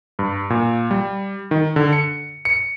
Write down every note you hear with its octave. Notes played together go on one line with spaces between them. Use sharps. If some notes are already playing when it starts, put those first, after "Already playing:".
G2
A#2
G3
D#3
D3
C#7
C#7